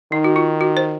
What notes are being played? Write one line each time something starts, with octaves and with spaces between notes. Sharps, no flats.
D#3 D#4
F#4
F4
F#4
C5